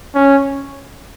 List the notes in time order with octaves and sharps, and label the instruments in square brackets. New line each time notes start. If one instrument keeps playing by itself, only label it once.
[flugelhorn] C#4